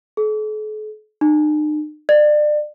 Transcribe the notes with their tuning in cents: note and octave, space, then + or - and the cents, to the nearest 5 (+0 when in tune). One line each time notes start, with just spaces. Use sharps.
A4 -45
D#4 -45
D5 +30